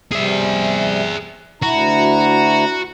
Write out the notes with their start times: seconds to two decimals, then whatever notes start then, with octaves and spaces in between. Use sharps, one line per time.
0.12 C3 G3 G#4 E5
1.62 D2 E4 F#4 A#5